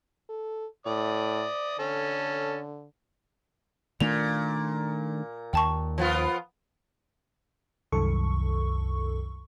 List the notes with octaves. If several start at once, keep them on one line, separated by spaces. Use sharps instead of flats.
A4
A2 D5 D#6
D3 C#4 A4
A#2 D#3 A3 D4 F7
D#2 G5 A5 C#6
F3 B3 F4
C2 F#2 D#3 A4 C#6